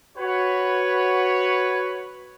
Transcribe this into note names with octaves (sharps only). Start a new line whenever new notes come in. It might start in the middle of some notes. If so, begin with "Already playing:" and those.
F#4 B4 C#5